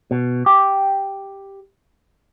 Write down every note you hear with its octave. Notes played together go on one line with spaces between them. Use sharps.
B2
G4